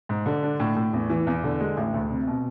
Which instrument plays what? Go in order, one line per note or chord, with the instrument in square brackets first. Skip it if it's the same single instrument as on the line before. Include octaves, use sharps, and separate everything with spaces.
[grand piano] G#2
D3
D4
A2
A2
E2
E3
E2
D3
G#3
A1
D2
C3
B2